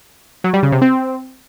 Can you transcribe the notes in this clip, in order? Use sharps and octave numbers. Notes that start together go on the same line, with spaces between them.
F#3
G3
C#3
C3
C4